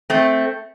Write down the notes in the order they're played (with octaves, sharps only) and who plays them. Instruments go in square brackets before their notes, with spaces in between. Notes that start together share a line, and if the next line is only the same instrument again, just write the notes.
[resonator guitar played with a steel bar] A3 C4